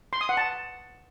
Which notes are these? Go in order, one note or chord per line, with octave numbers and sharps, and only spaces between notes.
C6
D#6
F#5
A5